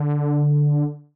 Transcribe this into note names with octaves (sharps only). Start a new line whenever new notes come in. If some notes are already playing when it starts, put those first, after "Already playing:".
Already playing: D3